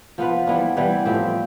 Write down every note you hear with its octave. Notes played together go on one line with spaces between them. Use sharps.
F3 B3 F4 B4
E3 G3 B3 D4
E3 G3 B3 D4
A2 F3 C4 G4